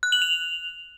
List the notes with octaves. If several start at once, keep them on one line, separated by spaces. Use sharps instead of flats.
F#6
F#7
F7